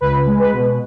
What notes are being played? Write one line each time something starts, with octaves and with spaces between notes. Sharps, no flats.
C#2 B4
G#3
B4
B2